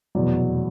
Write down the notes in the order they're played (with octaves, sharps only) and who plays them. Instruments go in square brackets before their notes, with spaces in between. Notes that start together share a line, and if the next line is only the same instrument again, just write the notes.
[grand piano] F1 E2 B2 F#3 D5